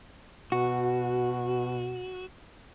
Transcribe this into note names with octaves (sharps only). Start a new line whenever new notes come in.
B2 F#4